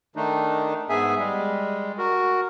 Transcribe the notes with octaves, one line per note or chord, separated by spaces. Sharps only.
D#3 A3 D4 D#4
G#2 B3 G#4 E5 G#5
G3 G#3
F#4 A#4